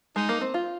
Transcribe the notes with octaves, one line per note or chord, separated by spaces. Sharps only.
G#3 D#4
A#3
C4
F4